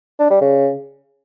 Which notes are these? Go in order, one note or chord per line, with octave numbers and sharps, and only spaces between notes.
D4
G3
C#3